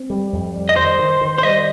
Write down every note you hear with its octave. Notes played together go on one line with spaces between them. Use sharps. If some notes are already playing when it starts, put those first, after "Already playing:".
Already playing: C4
G3
F2
G3
D#5
D#3 C5
D#3
D#3
C5
G3 D#5